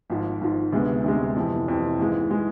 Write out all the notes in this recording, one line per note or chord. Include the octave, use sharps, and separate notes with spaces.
G#1 G#2 F3
G#1 G#2 F3
D2 C3 G#3 B3
D2 C3 G#3 B3
F2 C3 E3
F2 C3 E3
G#1 G#2 E3 G#3
E3 G#3